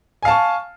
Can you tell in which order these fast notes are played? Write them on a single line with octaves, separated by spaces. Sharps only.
G#5 F5 A5 C#6